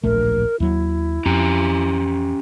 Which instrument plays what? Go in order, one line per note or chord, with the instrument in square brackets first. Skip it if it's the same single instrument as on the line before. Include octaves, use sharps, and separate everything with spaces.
[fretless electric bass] D1 A#1 A3 [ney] A#4
[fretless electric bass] D#2 F#3 [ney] E4
[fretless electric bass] F2 [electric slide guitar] C#4 G4 A#5